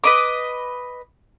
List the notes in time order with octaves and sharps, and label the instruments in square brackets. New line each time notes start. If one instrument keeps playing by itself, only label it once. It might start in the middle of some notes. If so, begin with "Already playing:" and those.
[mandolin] B4 D#5 D6